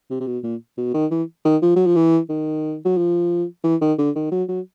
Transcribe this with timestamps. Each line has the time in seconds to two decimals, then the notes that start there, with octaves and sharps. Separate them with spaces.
0.10 C3
0.20 C3
0.27 B2
0.43 A#2
0.78 B2
0.94 D#3
1.11 E3
1.45 D#3
1.62 F3
1.76 F#3
1.86 F3
1.96 E3
2.29 D#3
2.85 F#3
2.97 F3
3.64 E3
3.81 D#3
3.99 D3
4.16 D#3
4.32 F#3
4.49 F#3